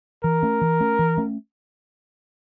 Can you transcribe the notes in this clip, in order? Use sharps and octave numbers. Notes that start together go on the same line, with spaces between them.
E3 A#4
A3 C#4
E3
A3 C#4
E3
A3 C#4